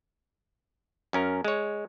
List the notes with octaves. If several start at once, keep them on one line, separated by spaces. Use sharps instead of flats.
F#2 C#4 A#4
G#3 C#5